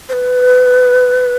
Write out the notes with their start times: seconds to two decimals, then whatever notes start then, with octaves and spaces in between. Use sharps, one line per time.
0.09 C5
0.13 B4